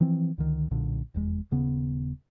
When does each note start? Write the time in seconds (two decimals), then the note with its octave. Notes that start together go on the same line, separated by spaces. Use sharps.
0.01 E3 F3 C4
0.38 C#2 D3 D#3
0.71 B1 A#2 D3
1.14 F1 E2 G#3
1.51 D#1 C#3 B3